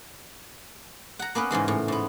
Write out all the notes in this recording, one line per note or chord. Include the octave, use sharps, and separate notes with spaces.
F#5 A#5
A#3 B3 C#4 B4
G#2 C#3 E3 G#3
A2
G#2 B3